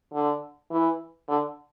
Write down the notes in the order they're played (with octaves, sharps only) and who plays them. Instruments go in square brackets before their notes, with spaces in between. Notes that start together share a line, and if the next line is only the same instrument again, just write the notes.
[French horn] D3
E3
D3